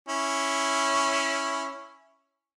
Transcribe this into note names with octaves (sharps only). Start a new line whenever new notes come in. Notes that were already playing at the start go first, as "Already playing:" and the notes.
C#4 E4